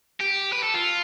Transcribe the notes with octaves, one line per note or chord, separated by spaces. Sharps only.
G4
B4
A4
F4